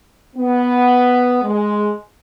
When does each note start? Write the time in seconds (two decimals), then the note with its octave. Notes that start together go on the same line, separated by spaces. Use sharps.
0.36 B3
1.42 G#3